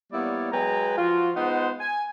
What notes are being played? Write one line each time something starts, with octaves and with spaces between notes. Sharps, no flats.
G3 A#3 B3 E4 C#5 D5
F#3 G#3 B4 G5 G#5 A#5
F3 F4 F#4
G#3 B3 D#4 F4 C5 F#5
G#5